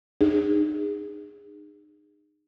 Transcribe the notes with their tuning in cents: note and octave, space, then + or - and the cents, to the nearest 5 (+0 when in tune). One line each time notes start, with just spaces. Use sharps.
D#4 -35 G#4 -20